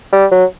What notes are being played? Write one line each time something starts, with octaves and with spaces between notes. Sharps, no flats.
G3
F#3